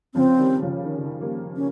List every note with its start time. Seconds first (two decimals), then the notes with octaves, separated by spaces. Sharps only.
0.15 C#3 F3 C4
0.39 D#3 G3
0.62 C#3 F3
0.85 D#3
0.96 C#3
1.06 D#3
1.20 G3 A#3
1.56 C#4